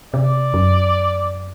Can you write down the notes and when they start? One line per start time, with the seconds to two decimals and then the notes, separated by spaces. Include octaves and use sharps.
0.14 C3 D5
0.54 F#2